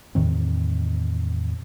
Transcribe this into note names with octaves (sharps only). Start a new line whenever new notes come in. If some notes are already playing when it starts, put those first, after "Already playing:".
E2 A2 D#3 C4